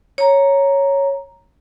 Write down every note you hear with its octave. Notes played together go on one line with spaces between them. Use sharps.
C#5 A#5